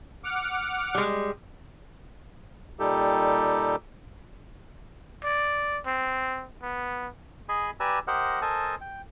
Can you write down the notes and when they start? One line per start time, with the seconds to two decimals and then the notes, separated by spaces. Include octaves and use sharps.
0.24 F#5 D6 F6
0.95 G3 G#3
2.80 A#2 G3 D#4 G4 A4
5.24 D5
5.86 C4
6.62 B3
7.49 G#4 D#5 G#5 B5
7.80 G4 B4 D5 G#5 A#5 E6
8.07 G4 A#4 C5 D#5 F#5
8.42 A4 A#4 C5 D#5 G#5 A5
8.81 G5